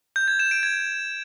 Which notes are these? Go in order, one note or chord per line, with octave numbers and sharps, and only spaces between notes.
G6
G#6
E7
D7
G#6